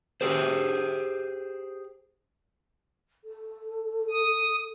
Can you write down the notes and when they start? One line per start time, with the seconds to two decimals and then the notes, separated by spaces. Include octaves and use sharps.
0.21 G4 G#4 C5
3.24 A4
4.11 D#6